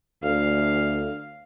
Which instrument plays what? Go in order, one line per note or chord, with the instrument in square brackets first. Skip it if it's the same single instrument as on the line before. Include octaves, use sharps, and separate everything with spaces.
[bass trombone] D2 [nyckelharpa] F5